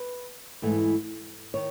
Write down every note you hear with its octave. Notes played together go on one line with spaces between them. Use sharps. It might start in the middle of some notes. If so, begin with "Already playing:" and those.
Already playing: B4
G#2 E3 A3
D#3 C#5